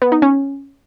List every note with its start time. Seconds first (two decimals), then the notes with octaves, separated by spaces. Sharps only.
0.02 B3
0.12 D#4
0.22 C#4